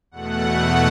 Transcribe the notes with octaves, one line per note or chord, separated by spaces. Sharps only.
E2 B2 A3 F#5